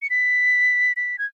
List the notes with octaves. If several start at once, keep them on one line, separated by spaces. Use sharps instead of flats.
C#7
B6
B6
G#6